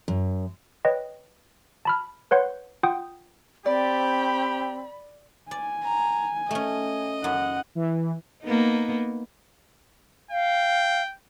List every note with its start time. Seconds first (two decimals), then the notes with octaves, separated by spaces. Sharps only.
0.08 F#2
0.85 B4 C#5 D#5 G5
1.85 A5 B5 F6
2.31 B4 C#5 F#5 C6 G6
2.83 F4 F#5 G5 D#6 G6
3.66 C4 G4 D5 B5
5.51 D5 G#5
5.84 A#5
6.51 A3 C#4 D#5
7.24 F#2 F#5
7.75 E3
8.44 A#3 B3 D#4
10.31 F5 G5